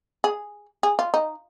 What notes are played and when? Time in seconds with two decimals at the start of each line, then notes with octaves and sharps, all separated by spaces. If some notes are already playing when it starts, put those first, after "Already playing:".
0.24 G#4
0.83 G#4
0.99 F4
1.14 D#4